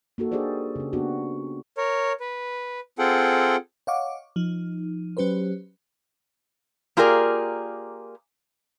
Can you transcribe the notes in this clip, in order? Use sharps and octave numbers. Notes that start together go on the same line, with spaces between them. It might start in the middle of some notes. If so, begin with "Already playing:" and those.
A#3 D#4 F#4 A4
D4 G4 G#4 A#4 C5 D5
C#3 C#4
A#3 B3 D4 F#4 G4
A#4 C#5
B4
C4 F4 G#4 A4 F#5 G5
C#5 D#5 F5 F#5 C#6 D6
F3 D#4
F#3 C#4 G4 B4 C5
A#3 F4 G4 G#4 A#4 D5